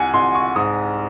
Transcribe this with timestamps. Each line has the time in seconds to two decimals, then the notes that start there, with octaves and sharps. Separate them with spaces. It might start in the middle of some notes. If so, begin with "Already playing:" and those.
Already playing: C2 F#5 G#5
0.14 C2 C6
0.35 C#6
0.56 G#2 D#6